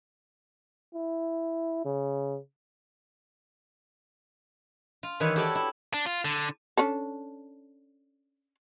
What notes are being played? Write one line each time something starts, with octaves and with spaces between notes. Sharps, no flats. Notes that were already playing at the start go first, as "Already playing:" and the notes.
E4
C#3
F4
D#3 E3 G3 B4 C#5
E4 F#4 G4 A4 C#5 D5
E4
D4
F4
D3
C#4 D4 A4